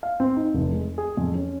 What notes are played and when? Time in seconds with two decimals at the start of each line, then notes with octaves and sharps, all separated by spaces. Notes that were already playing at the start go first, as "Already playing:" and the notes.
0.03 F5
0.20 C4
0.36 D#4
0.54 F1
0.72 G#3
0.98 G#4
1.17 F2
1.35 C#4